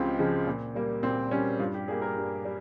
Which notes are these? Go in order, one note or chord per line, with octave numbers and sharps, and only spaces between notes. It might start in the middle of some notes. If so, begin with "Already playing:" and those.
Already playing: C#2 C#3 F3 G#3 C4 F4 G4
C#3 F3 G#3
A#2
G3 A#3
A#2 C4
G3 A#3 C#4
G2 F4
G4
G3 A#3 G#4
A#4
G2
G3